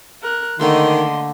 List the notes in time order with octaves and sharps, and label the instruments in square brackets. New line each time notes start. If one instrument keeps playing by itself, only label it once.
[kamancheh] A#4 F#6
[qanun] D3 A3 A#3 [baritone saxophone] D#3 [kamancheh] D#5 C6